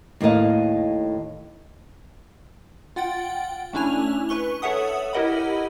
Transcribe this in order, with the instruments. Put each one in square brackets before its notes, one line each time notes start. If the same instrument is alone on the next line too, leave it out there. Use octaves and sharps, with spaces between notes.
[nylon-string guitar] D#2 A2 A#4 D#5 F5
[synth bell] F4 F#5 G5 A6 D7
A3 C#4 D4 E4 G#5 F7
B4 C#6 G7
A4 C#5 E5 F#5 D#6
E4 G4 A#4 D#5 F#5 B5